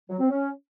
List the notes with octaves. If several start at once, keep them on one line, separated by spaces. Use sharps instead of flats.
F#3
C4
C#4